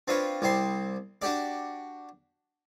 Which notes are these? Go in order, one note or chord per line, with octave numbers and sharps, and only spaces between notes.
C4 D4 F4 B4 C#5
C2 G3 C4 C6
D4 F#4 G4 D5